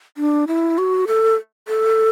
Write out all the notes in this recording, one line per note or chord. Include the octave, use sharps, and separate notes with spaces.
D4
E4
F#4
A4
A4